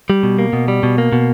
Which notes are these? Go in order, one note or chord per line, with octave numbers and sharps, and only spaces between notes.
G3
B2
A#3
B2
G3
B2
A#3
B2